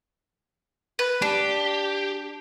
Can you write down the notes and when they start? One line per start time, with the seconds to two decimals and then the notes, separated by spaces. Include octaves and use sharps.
0.99 B4
1.22 D4 G4